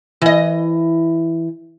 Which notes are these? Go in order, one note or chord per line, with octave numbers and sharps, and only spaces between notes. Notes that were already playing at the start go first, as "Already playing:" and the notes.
E3 D#5